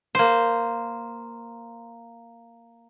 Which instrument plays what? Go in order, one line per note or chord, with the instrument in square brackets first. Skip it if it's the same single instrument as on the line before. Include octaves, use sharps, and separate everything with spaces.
[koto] A#3 C5